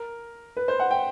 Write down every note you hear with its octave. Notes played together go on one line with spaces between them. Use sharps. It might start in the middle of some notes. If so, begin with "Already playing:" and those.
Already playing: A#4
B4
C5
F#5
G5